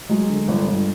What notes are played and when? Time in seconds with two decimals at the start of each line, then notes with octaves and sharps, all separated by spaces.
0.09 F#3 G#3
0.29 D3
0.48 G1
0.67 G1